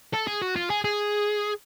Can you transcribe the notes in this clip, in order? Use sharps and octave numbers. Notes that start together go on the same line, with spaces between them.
A4
G#4
F#4
F4
G#4
G#4